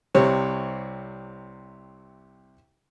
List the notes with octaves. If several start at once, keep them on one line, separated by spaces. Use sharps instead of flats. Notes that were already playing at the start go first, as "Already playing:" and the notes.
C2 C3 C#5